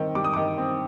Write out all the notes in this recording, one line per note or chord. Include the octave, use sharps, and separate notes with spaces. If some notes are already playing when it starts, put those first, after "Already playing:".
Already playing: D#3 G3 C4
G3 D6
D#6
D#3 D6
C4